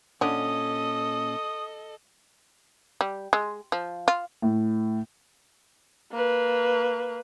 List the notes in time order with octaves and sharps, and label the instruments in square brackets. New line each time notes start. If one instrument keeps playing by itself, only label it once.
[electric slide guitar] A#2 C#4 [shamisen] D3 D4 [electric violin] A4 D#5 [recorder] D#6
[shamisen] G3
G#3
F3
F4
[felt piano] A2
[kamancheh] A#3 B4